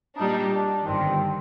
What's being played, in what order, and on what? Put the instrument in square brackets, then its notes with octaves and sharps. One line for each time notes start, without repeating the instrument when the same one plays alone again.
[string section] A#2 G3 D4 [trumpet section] D#4
[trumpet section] D4
[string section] G1 G2 D#3 [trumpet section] C4